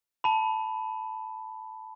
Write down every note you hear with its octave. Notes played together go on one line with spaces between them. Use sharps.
A5 B5